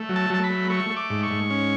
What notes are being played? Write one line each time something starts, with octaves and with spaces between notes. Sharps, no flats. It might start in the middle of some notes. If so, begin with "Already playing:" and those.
Already playing: A3
F#3
A5
F#3 A5
B5
A3
A3 C#6
A3
D6
G#2
C#6
G#2
C#4